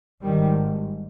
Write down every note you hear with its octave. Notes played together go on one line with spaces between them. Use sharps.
G#1 G#2 D#3 G3